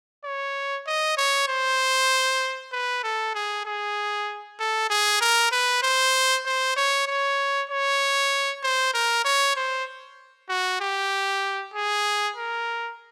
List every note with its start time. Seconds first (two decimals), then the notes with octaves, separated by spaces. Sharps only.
0.24 C#5
0.87 D#5
1.17 C#5
1.48 C5
2.72 B4
3.03 A4
3.35 G#4
3.66 G#4
4.60 A4
4.90 G#4
5.21 A#4
5.52 B4
5.83 C5
6.46 C5
6.76 C#5
7.07 C#5
7.70 C#5
8.63 C5
8.94 A#4
9.24 C#5
9.56 C5
10.49 F#4
10.80 G4
11.74 G#4
12.36 A#4